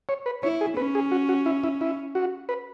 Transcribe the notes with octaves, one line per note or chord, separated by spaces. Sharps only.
C#5
B4
E4 C#5
G#4
C#4 B4
G#4
F#4
F#4
E4
E4
E4
F#4
B4